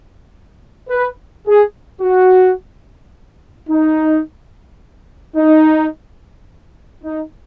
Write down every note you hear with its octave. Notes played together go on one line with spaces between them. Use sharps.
B4
G#4
F#4
D#4
D#4
D#4